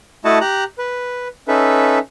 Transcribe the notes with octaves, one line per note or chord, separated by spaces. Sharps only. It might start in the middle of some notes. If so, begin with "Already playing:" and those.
A3 E4 F#4 D#5 F#5 A5
G4 A#5 F#6
B4
C#4 D#4 A4 B4 E5